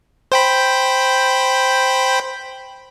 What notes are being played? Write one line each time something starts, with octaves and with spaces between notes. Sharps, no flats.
C5 G5 B5